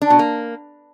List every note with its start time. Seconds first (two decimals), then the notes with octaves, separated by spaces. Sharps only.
0.02 D4
0.10 B2
0.19 A#3